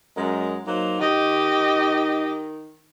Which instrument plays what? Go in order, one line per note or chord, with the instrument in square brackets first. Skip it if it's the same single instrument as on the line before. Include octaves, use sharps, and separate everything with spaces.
[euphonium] F#2 [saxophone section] G#3 A#4 D#5
[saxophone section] F#3 A#3 C5 [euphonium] D#4
[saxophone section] D#3 [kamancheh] G4 D#5